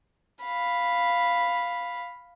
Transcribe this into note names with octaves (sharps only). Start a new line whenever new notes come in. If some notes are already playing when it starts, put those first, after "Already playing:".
F5 B5